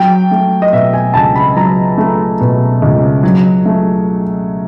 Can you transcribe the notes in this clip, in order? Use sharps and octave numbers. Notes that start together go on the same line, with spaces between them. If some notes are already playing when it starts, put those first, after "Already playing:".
Already playing: F#3 G5
A3
D#5
B2 E5
G#5
C#2 A5
B5
F#3 A#5
A3
B2
C#2
F#3
A3